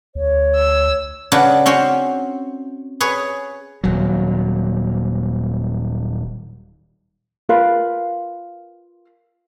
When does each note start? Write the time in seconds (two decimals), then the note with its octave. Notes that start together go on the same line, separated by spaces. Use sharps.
0.15 D2 C#5
0.56 E6
1.32 C#3 D4 F#4 B4
1.66 C4 C#4 F#4 C5
3.00 G#4 B4 C#5
3.84 D#1 F#3
7.49 F4 A#4 B4 F5